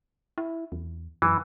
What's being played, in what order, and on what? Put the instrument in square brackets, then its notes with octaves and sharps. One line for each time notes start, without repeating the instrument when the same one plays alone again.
[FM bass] E4
E2
[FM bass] F#2 [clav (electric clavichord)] E3